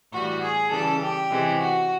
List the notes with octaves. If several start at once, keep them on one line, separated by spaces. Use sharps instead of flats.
A2 E3 G3 F#4
G#4
C#3 E3 G3 A4
G4
C3 E3 G#3
F#4